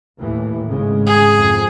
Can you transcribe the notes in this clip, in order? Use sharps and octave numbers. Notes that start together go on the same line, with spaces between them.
D#2 A2 E3
G#1 C#3 G#3
G#4
F2